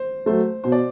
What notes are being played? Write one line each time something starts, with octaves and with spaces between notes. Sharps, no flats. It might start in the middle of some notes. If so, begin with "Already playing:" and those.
Already playing: C5
F#3 A3 C5
B2 C5
D5